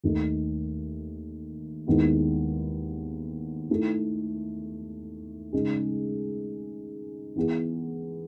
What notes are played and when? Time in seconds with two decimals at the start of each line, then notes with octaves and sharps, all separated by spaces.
0.04 D#2 D#3 A3 D#4
1.87 D#2 D#3 G#3 B3 E4
3.69 D#3 A3 E4
5.53 C#3 G#3 D#4 G#4
7.36 E3 B3 E4 G#4